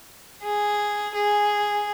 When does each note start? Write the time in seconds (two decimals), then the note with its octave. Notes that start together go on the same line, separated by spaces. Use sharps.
0.43 G#4
1.15 G#4